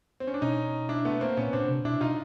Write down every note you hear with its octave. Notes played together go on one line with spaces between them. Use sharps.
C4
C#4
D4
B2 C#4 D#4
D4 E4
A3 B3
A#3 C4
A#2 B3 C#4
A#2 C4 D4
C3
B2 D4 E4
B2 D#4 F4